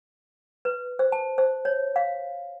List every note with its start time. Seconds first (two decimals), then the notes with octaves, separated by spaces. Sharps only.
0.65 B4
0.99 C5
1.12 A5
1.38 C5
1.65 C#5
1.96 F5